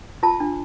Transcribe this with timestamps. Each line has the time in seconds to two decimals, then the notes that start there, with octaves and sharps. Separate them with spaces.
0.23 F4 A5
0.40 D4